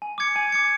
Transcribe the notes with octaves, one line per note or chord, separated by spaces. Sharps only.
G#5
D6 G#6 C#7
G#5
D6 G#6 C#7